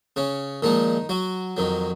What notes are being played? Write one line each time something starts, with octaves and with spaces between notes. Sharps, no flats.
C#3 C#4
A#2 D#3 F3 G#3 D#4
F#3 F#4
F2 D#3 F#3